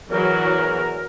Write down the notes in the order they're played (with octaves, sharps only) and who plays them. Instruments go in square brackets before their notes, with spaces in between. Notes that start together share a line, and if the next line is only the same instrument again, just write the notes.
[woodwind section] E2 A#4 [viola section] E3 F#3 F#4